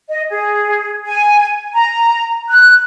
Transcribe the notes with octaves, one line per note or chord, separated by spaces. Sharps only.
D#5
G#4
G#5
A#5
F#6